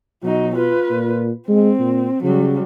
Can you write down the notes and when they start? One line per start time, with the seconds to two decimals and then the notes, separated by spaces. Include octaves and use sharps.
0.23 B2 F#3 D#4
0.56 F4 B4
0.90 A#2
1.48 G#3 C4
1.79 A#2
2.24 C#3 F#3 G3